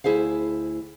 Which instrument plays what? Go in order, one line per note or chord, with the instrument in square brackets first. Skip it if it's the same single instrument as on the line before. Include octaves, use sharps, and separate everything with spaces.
[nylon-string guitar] D2 E4 G#4 C5 F5